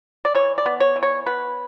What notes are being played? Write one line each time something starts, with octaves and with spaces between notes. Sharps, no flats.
D5
E3 C#5
D5
B3
C#5
E3
C#5
B3 B4